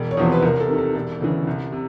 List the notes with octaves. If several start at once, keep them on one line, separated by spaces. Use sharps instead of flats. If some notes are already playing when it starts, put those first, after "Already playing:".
Already playing: E1
C#5
E2 C3 F3 C5
B4
C2 A#4
A4
C3 D#3
A4
E1 A4
D2 C#3 E3
C2
C3